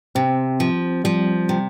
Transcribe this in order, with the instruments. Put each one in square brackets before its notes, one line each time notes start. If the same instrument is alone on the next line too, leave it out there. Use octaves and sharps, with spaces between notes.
[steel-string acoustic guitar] C3 [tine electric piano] C4
[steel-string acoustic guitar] F3
[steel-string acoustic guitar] F3 [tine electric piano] G3
[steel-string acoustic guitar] C3